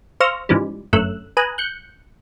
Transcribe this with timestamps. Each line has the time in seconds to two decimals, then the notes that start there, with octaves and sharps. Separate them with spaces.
0.20 C5 F5 C#6 E6 F6 A#6
0.49 G#2 C#3 E3 F3 G3
0.93 G1 F#2 A2 A3 E6 F#6
1.37 B4 G#5 A#5 D#6 F#6
1.58 F#6 G6 C#7